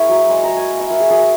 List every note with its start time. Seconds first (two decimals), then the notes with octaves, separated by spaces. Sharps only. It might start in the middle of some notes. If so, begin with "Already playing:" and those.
Already playing: A#3 E4 G#4 G#5 C#6
0.09 F#3
0.29 G#3 C#6
0.43 A#5
0.49 G#3
0.57 G#5
0.70 A#3
0.80 E5
0.90 A#3 F#4
1.00 G#4
1.10 F#3 G#4